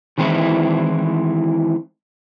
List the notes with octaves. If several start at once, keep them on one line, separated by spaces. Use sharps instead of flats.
D#3 E3 G#3 C4 E4